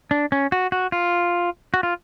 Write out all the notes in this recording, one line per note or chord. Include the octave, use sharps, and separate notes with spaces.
D4
C#4
F#4
F#4
F4
F#4
F4